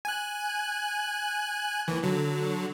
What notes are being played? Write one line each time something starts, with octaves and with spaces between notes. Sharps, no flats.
G#5 F#6
D#2 E3
D3 F#3